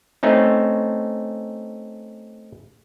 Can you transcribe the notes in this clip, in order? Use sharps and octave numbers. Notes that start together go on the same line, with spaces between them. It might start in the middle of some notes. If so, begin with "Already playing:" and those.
A3 C4 C#4 D#4